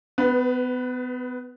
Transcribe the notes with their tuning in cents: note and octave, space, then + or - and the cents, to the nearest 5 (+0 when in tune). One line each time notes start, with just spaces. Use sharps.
B3 +30 B4 +0